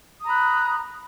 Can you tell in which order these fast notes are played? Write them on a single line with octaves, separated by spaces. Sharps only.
D#6 A#5 B5 F#6